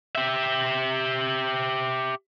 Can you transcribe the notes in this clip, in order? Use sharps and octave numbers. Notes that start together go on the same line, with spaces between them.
G4 E5